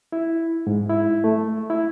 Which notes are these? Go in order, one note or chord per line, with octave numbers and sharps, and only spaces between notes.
E4
G#2
E4
A3
E4